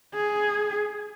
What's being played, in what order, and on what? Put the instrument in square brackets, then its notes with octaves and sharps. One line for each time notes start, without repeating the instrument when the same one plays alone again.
[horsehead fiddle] G#4